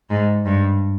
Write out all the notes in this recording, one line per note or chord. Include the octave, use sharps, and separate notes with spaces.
G#2
G2